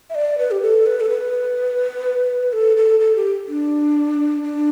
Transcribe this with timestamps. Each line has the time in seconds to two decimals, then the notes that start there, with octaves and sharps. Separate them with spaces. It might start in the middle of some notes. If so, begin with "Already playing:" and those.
0.10 E5
0.15 D5
0.38 B4
0.51 G4
0.62 A4
0.86 B4
1.00 A4
1.10 B4
2.53 A4
2.77 A4
3.00 A4
3.15 G4
3.48 D4
4.43 D4